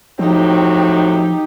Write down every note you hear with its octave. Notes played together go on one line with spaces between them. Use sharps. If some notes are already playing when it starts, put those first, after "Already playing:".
A2 F3 F#3 C4 D#4 G4